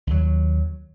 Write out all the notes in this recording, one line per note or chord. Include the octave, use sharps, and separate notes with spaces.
D#2 F#3